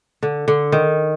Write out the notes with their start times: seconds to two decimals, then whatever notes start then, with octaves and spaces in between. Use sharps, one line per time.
0.23 D3
0.48 D3
0.72 D#3